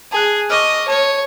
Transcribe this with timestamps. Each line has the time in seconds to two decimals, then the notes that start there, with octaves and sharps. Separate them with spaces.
0.12 G#4 A5 F#6
0.50 D#5 C#6 D6 F6
0.88 C#5 A5